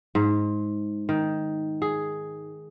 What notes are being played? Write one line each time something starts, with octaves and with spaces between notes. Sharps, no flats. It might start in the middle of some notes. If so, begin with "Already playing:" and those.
G#2
D#3
G#4